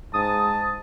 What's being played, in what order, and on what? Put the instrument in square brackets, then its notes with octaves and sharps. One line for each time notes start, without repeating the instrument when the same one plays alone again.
[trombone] G#2 [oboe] A5 [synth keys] D#6